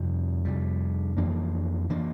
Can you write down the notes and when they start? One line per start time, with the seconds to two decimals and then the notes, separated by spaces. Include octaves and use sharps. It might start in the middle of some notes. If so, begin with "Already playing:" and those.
Already playing: F2 C3 G3
0.45 F2 C3 G3
1.17 F2 E3 A#3 D4
1.90 E3 A#3 D4